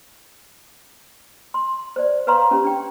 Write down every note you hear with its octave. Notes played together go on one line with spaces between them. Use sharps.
C6
C5 D5
B4 C#5 F5 A#5 C6 C#6
C#4 G4
D4 G5